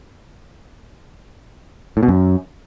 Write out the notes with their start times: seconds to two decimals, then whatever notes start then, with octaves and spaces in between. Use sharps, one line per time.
1.97 A2
2.03 B2
2.08 F#2